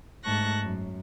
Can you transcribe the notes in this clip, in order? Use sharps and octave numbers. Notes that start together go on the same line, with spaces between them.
G#2 A3 A5 C#6 F#6 A#6
F#2